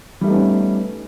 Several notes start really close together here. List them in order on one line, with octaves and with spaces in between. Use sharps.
G3 A3 D#4 B3 C#4